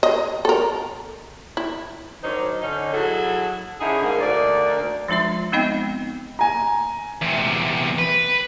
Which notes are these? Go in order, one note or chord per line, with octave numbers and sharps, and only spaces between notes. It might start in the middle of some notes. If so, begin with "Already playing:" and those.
D#5
A4 A#4
E4
D#3 F#3 D4 D#4 C5 C#5
D3 C#4 D#4
F#3 E4 G#4 A4
D3 C#4 D#4 E4 G#4
G#2 A#3 G#4
D2 A#3 D#4 D5
F3 G#3 D4 F4 E5
G#3 B3 C4 D#4 D#5 G5
G#5 A#5
E2 C3
B4